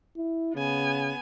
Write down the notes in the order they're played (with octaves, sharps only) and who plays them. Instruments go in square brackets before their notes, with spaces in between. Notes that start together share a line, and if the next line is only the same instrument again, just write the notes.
[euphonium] E4
[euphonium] C#3 [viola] B3 G#5